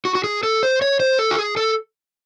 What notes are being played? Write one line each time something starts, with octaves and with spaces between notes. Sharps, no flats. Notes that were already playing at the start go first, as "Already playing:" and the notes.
F#4
F#4
G#4
A4
C5
C#5
C5
A4
F#4
G#4
A4